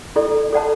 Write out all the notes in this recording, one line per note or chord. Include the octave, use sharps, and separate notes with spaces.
E4 A4 D5
A4 D5 F#5 A5